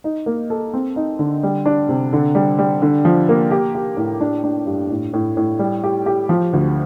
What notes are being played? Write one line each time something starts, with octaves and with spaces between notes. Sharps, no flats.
D#4
A#3
A4
C4
D#4
D3
G3
D4
C3
D3
G3
G3
D3
F3
A#3
G4
G4
A2
D4
D4
G2
A2
A2
A2
G3
G4
G4
F3
D2